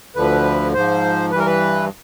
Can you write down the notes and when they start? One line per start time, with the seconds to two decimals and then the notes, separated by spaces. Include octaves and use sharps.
0.16 D2 D3 F3 B4
0.74 G#2 F3 C5
1.31 G2 E3 B4
1.39 A#4
1.46 B4